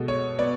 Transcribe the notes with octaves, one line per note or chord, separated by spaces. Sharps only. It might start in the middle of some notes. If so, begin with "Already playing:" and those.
Already playing: B2 G#3 A4
C#5
B3 D5